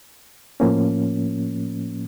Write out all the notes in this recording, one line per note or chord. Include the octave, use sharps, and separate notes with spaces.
A2 F3 A#3 C#4